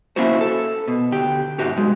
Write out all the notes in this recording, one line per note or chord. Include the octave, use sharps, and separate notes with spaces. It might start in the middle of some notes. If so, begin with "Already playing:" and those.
A#3 C#4 E4 F#4 C5
A4
B2
D2 G4
G#2 F#4 G4
B1 G2 G#3